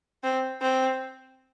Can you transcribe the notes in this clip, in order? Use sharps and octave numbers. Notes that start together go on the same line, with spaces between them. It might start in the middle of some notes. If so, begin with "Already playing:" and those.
C4
C4